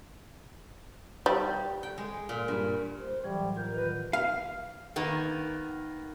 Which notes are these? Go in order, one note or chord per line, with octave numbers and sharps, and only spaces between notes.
G3
G5
G#3
A#2
G2
C5
A2 E3 F#3 G3
F4 A#4 G6
D#3 F#3 B4
F5
D#3 A#3 B3